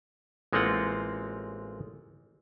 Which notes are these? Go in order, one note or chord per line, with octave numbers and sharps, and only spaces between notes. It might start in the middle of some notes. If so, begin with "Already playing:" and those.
A1 G#3 A#3 C4 F4 F#5